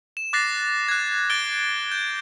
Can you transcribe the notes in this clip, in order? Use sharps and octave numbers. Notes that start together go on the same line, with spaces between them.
E7
D6 F#6 A6 A#6 C7
F#6 G#6
F#6 A6 D7 G7
G6